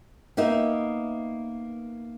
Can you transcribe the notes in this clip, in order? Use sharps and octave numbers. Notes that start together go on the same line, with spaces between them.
A#3 B3 D#4 E5